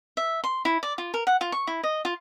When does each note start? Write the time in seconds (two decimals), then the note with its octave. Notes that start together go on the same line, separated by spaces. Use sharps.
0.17 E5
0.44 C6
0.65 E4
0.83 D5
0.98 F4
1.14 A#4
1.27 F#5
1.41 F4
1.52 C#6
1.67 E4
1.83 D#5
2.05 F4